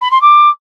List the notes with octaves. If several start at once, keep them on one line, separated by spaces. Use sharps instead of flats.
B5
C6
D6